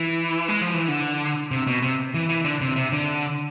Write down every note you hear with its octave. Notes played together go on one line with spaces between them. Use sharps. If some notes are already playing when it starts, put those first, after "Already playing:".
Already playing: E3
G#3
F3
E3
D3
C3
B2
C3
E3
E3
D3
C3
C3
D3